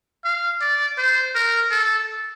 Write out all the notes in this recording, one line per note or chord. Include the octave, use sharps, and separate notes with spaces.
F5
D5
C5
A#4
A4